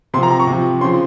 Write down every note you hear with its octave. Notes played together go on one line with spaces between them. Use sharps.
C3 F3 A#5 C6
A#5
C#6
C3
F3
C#3 F3 C6